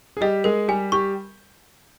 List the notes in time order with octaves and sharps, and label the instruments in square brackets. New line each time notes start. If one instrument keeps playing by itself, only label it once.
[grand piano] G#4
[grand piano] G3 G4 [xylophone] D#5
[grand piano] G#3 G#4 [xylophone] A#4
[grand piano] G3 G4 [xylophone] G#5
[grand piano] G3 G4 [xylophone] C#6